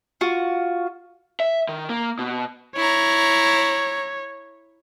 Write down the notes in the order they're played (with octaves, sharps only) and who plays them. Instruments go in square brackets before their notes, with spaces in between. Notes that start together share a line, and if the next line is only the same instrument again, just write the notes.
[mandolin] F4 F#4
[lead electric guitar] E5
D#3
A#3
B2
[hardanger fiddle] E4 A#5 [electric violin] C#5